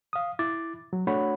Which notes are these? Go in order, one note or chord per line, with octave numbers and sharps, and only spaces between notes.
F5 D#6
E4 D6 A6
F#3
A3 D4 F#4 C#5 F#5 B5